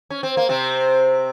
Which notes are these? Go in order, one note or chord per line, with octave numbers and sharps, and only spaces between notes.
C#4
C4
A#3
C3 C4